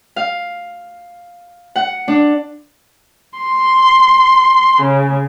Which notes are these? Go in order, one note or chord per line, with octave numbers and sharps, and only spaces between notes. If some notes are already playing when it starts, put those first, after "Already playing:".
F5
F#5
D4
C6
C#3